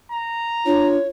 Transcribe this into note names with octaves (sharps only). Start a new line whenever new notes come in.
A#5
D4 F4 C#5